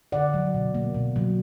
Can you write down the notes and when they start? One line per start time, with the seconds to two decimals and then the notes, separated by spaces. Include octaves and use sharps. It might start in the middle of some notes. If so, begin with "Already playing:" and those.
0.12 D3 D5 F#5
0.34 F#3
0.54 B2
0.74 A#3
0.94 B2
1.16 F#3